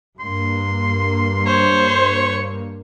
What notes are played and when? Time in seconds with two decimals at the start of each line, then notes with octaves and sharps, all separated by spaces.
0.20 G2 A#3 C6
1.46 C5 C#5